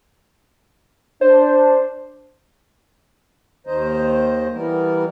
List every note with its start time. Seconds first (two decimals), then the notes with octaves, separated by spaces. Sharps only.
1.21 D4 C5
3.67 D#2 D#3 C5 D#5 A#5
4.53 E3 G3 B3 A#4